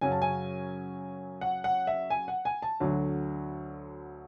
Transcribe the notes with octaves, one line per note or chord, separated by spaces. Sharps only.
F#2 C#3 F#3 C#4 G#5
A5
G#5
F#5
F#5
E5
G#5
F#5
G#5
A5
D2 D3 F#3